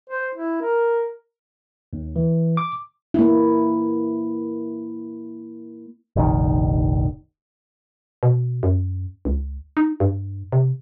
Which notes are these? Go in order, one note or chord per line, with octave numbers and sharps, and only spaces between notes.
C5
E4
A#4
D#2
E3
D6
A#3 E4
F1 A#1 D#3
B2
F#2
C#2
D#4
G2
C3